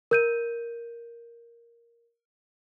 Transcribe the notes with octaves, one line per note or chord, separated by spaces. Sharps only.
A#4 G6 D#7